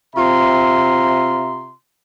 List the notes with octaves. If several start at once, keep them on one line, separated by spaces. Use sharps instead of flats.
C3 C4 F4 E5 A#5 C6